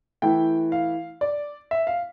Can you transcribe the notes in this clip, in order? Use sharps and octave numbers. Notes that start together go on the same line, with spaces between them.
E3 A3 E4 G5
F5
D5
E5
F5